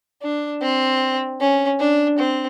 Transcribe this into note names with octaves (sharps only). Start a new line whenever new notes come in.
D4
C4
C#4
D4
C4